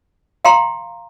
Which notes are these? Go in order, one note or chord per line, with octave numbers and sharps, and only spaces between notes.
F5 G5 A#5 C6